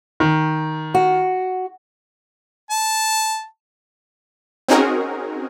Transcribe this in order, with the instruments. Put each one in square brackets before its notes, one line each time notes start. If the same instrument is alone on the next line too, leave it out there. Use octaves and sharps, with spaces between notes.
[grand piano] D#3
[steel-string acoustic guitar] F#4
[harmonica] A5
[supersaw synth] C4 C#4 D#4 F#4 G#4 A#4